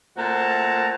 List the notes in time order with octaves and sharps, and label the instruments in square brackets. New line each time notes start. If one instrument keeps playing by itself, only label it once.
[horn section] A#2 A3 C4 F#4 A5 A#5